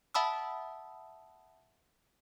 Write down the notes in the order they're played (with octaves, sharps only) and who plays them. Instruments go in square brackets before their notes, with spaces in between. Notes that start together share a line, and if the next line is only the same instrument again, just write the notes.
[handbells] E5 F#5 A5 B5 D#6 E6